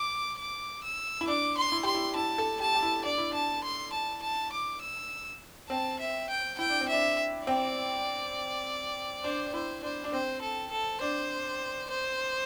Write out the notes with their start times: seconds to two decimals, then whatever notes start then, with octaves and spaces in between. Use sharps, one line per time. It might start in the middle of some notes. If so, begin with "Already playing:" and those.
Already playing: D6
0.38 D6
0.83 E6
1.21 E4
1.27 D4 D6
1.57 C6
1.72 E4
1.83 G4 C6
1.95 E4
2.16 E4 A5
2.38 A4
2.60 G4 A5
2.75 G4
2.82 E4
3.04 D4 D5
3.18 E4
3.31 D4 A5
3.64 C6
3.93 A5
4.23 A5
4.52 D6
4.81 E6
5.70 C4 A5
6.00 E5
6.30 G5
6.58 E4 G5
6.69 D4
6.81 C4
6.89 D4 E5
7.47 C4 D5
9.24 D4 C5
9.46 D4
9.54 E4 C5
9.83 D4 C5
10.04 D4
10.13 C4 C5
10.42 A4
10.71 A4
11.01 D4 C5
11.90 C5